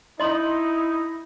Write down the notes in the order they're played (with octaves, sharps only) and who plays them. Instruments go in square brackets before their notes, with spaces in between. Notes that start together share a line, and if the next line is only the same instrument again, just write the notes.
[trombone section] D#4 [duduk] E4 [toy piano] D#5 C6